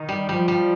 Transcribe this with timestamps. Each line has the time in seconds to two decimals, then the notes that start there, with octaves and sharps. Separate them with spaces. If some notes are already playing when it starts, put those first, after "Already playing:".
Already playing: D#3 D#4
0.09 G3
0.29 F3 G3
0.48 G3